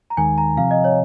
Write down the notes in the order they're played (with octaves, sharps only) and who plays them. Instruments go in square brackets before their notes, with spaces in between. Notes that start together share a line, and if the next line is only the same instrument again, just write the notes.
[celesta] A#5
[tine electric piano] D#2 D#3 G#3 [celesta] G#5
[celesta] A#5
[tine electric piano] C3 F3 C4 [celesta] F5
[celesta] D#5
C#5